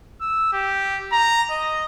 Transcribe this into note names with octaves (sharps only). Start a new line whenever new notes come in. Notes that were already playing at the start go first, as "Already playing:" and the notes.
E6
G4
A#5
D#5